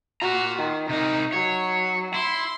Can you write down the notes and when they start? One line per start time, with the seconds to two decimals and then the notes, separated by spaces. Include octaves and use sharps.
0.22 F4 F#4 A#5
0.59 D#3
0.89 C3 D#4 A#4
1.33 F#3 C#5
2.14 E4 C6